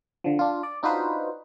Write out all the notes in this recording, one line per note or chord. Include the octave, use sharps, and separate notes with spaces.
D3 F3
D4 F4
D5
D4 D#4 F4 F#4 B4 C5